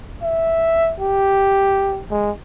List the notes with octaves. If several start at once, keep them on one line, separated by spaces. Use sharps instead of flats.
E5
G4
G#3